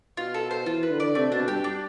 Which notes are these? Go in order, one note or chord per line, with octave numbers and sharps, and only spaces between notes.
B2 F4
A4
C5
E3 F4
B4
D3
D5
C3 A3
B2 D4
G2 G4
D4